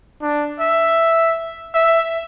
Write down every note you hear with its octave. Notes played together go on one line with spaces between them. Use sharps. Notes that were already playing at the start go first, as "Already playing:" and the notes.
D4
E5
E5